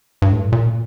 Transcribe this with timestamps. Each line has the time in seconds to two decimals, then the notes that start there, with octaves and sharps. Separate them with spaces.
0.22 G2
0.32 A2
0.52 A#2